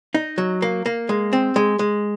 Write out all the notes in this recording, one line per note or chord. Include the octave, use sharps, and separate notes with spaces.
D#4
F#3
A#3
A#3
G#3
C4
G#3
G#3